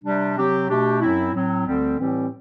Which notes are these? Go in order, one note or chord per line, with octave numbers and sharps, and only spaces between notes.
C3 G3 D4
C3 F#3 C4 G4
B2 A3 D4 G4
F#2 F#3 C4 E4
A2 F#3 C4
D2 D3 G3 C4
A2 E3 G3 C4 G4